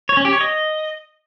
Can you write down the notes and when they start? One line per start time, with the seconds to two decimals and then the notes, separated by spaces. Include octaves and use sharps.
0.09 C#5
0.17 C#4
0.25 G4
0.33 C#5
0.41 D#5